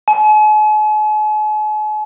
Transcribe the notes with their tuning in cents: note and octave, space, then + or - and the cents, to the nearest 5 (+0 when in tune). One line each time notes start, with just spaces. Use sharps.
G#5 +45